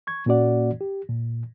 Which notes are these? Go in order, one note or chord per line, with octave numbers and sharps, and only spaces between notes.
C#6 G#6
A#2 A#3 C#4 F#4 D5 F#5
G4
A#2